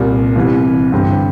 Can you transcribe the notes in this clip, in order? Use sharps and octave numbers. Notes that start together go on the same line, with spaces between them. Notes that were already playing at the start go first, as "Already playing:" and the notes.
Already playing: C2 A#2
C2 C3 E3
G2 D3 C4